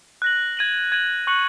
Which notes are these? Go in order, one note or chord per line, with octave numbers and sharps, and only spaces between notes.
F#6 A#6 F#7
G#6 D#7 F#7
G#6 D#7 F#7
C#6 F#6 C#7 F#7